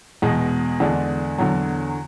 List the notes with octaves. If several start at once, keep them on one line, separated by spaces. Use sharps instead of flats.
E2 B2 G#3
E2 D3 G#3 D4
E2 D3 F#3